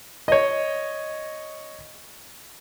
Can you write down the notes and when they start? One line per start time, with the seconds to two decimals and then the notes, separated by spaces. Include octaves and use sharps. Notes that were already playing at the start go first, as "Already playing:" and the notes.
0.28 C#5 D#5